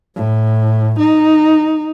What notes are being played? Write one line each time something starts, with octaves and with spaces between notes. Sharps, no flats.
A2
D#4